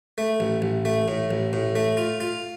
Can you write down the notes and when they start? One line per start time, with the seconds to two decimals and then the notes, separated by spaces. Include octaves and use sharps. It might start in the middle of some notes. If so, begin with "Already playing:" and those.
0.18 A3
0.40 A1
0.62 A1
0.85 A3
1.08 A2
1.31 A1
1.53 A2
1.76 A3
1.97 F4
2.20 F4